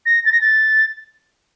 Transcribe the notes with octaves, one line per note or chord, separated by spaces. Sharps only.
A#6
A6
A#6
A6